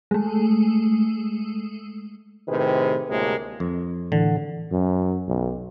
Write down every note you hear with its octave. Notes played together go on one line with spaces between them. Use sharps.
G#3 A3
A2 C3 D#3 G#4 B4 C5
D2 A2 C3 G#3 A#3 A#4
F2
A2 D3 E3 F#5
F#2
B1